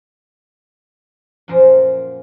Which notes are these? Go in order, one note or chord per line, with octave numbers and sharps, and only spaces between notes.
F#2 A#2 F3 A#4 C5